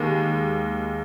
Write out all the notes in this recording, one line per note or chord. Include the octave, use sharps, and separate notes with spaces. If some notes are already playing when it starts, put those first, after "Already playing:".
Already playing: D#2 G#3